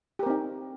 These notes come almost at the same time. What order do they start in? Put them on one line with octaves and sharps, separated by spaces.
G4 A#4 C4 D#4